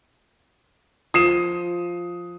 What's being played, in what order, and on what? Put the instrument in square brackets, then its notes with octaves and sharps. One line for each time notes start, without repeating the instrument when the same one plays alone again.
[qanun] F3 [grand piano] D#6 C7 E7